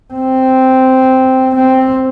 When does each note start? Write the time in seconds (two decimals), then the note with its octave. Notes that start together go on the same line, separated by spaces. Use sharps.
0.13 C4
1.55 C4